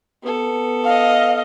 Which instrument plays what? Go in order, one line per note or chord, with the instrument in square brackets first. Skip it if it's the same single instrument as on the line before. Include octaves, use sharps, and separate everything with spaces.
[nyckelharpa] B3 A4
[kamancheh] D#5 F5